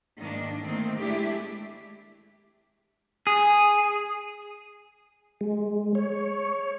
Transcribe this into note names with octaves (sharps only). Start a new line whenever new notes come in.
G#2 D#3 A#3 D4
D#3 A3 A#3 C4
G#3 A3 D4 E4 G4
G#4
G#3
C#5